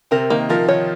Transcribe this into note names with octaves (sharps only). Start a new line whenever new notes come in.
C3 C4 A#4
D#3 A#3 D#4
F3 F4 A#4
D#3 D#4 C#5